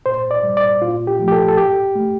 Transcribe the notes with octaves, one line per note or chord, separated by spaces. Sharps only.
A#2 C5
D5
G3
D5
A#2 F4
G4
F3 A3
G4
A4
A4
A2 G4
A3